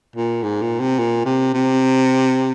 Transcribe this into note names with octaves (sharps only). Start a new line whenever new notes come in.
A#2
G#2
A#2
C3
A#2
C3
C3